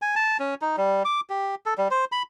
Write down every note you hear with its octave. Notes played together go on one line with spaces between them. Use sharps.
G#5
A5
C#4
D#4
G3
D6
G4
A4
G3
C5
B5